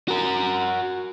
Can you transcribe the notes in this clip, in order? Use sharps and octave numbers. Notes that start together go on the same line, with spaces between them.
F#4 A#4